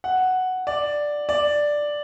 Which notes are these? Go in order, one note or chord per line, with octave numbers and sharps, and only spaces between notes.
F#5
D5
D5